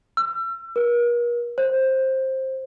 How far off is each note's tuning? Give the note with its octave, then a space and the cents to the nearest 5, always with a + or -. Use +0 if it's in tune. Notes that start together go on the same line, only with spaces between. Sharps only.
E6 +40
A#4 +45
C5 +15